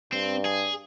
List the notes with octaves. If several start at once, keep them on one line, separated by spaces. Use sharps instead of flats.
G2 C4
G#4